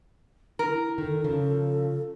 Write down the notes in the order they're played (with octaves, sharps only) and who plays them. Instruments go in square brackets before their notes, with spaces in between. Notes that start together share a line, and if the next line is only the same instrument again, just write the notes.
[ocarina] E4 [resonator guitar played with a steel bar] A#4
[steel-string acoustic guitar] D#3 [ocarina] A4
[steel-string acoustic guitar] C#3 F3